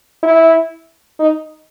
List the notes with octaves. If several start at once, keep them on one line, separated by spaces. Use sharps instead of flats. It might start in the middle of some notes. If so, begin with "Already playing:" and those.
E4
D#4